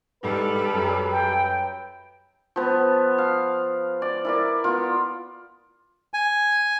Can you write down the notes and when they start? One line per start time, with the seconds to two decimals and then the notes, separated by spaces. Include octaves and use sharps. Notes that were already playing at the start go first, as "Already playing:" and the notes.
0.24 G#2 G3 A4 B4
0.73 F#2
1.11 G5
2.56 F3 B3
3.18 F5
4.02 D5
4.25 E4 A#4 D5
4.64 B3 F4
6.14 G#5